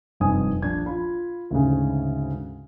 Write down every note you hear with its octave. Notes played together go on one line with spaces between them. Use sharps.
F1 G2 C4 D#4 G#5 D#6
A#1 D4 G#6
F4 B5
D2 G#2 C#3